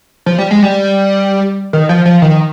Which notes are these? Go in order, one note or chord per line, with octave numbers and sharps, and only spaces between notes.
F3
G3
G#3
G3
D#3
F3
F3
D#3